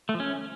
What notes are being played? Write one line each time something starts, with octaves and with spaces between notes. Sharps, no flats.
A3
F3
C#4